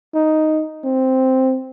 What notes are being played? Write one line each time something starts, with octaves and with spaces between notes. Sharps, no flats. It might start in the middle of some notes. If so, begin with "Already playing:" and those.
D#4
C4